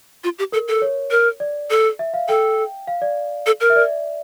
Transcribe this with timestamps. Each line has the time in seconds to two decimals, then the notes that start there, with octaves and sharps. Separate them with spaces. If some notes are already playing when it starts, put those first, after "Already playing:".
0.24 F4
0.39 G4
0.52 A4 A#4
0.68 A4
0.82 C#5
1.11 A#4
1.40 D5
1.70 A4
1.99 E5
2.14 F5
2.28 A4 G5
2.87 F5
3.02 D5
3.46 A4
3.61 A#4
3.70 E5
3.76 D5